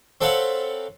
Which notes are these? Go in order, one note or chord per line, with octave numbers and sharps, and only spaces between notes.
C4 A4 C#5 F5 F#5 B5